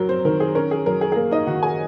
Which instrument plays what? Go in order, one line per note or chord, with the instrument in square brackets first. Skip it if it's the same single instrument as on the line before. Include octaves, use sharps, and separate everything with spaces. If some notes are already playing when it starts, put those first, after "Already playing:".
Already playing: [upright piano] F#2 F#3 A#4
C4 C5
D#3 A#4
G#4
C#4 A#4
G#4
F#2 A#4
G#4
G#4
A#3 A#4
D#4 D#5
D#3 F#4 F#5
G#4 G#5